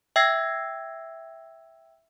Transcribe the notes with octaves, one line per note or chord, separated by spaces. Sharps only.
E5 G5 E6 G#6 A#6 C7